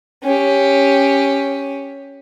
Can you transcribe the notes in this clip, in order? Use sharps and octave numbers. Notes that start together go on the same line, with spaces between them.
C#4 G4